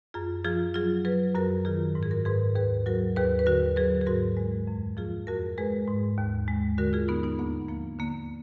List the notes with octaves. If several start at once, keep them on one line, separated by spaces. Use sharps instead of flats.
F#2 F4 G#4
F3 F4 G#4
F#3 F4 G#4
F#3 G#4 B4
F#2 F#4 A#4
D#3 F4 G#4
G#2 A#4
G#4
F#4 A#4
G#2 G#4 B4
D#2 G#4 B4
F#3 F#4 A#4
D#2 G#4 B4
B4
D3 F#4 A#4
F#3 G#4 B4
G#4
G#2 F#4 A#4
G#3
F2
F3 F4 G#4
F2 F#4 A#4
G#3 G#4 B4
G#2
D#2
G#3
D3 F#4 A#4
F4 G#4
D3 B3 D#4
B3 D#4
D2 A#3 D4
F3 A#3
D3 A#3